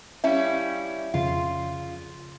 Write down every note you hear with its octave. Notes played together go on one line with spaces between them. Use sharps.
G3 C#4 E4 E5 F5
F2 C#3 F4